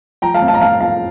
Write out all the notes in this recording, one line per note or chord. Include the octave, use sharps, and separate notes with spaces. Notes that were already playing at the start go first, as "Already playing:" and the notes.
F3 G5 A#5
F5 A5
F2
F5 A5
A#5
F2 F5 A5
F3 F5 A5